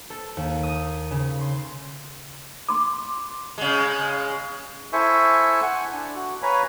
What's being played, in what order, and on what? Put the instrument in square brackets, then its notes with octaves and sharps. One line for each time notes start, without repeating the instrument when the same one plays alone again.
[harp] A4
D#2
D#6
C#3
C6
[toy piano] C6 D6
[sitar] C#3 G#3
[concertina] E4 A4 C5 E5 G#5 C#6
F#5 G#5
D4
F#4
B4 C#5 F5 G#5 A#5 B5